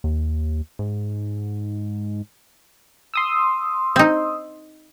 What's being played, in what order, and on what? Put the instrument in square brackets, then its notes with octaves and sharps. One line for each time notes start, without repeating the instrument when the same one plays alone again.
[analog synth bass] D#2
G#2
[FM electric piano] C6 D#6 E6
[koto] C4 D#4